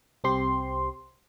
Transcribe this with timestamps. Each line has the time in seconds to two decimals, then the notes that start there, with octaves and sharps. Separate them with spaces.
0.24 C2 C4 G4 C6